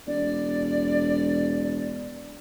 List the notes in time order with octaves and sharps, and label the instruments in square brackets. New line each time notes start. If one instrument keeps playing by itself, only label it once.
[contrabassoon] E1 [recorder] D5